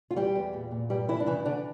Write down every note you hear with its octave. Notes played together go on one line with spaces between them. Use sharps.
F4
E2 G3 G4
E2
A#2
A#2
G2 G3 G4
G2 E3 E4
D4
C#3 E3 E4
D3 E3 D4